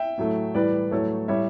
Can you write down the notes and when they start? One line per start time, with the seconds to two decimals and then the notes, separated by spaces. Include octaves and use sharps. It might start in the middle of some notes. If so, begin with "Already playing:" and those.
Already playing: E5 G5
0.18 A2 F#3 A3
0.54 A2 E3 G3 B4 D5
0.91 A2 F#3 A3 A4 C#5
1.28 A2 G3 C#5 E5